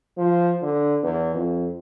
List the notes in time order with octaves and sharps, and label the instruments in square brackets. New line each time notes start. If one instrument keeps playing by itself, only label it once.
[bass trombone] F3
D3
E2
F2